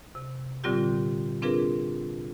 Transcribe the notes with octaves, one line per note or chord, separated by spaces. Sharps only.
C3
A#2 D3 G3 C4 F4 G4
C4 D4 F4 G#4 A#4 B4